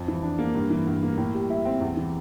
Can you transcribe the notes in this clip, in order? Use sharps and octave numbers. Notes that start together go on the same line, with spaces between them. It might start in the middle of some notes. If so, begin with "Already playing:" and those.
Already playing: F2
E3
D4
A#3
G2
E3
G2
A#3
A2
G3
E4
C4
E2
E3